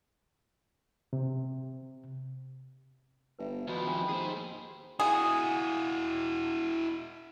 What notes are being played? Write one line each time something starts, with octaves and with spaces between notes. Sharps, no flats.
C3
G1 B4 E5
D#2 B2 F3 E5 B5
G#1 G5 G#5 B5
D#2 G#4 C5
E4 F#4 G#4